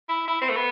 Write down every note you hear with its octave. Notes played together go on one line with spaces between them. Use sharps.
E4
E4
C4
A3
B3